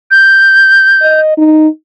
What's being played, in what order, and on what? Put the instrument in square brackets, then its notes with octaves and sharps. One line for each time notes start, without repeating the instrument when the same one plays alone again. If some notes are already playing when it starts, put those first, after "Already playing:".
[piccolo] G6
[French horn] D#5
D#4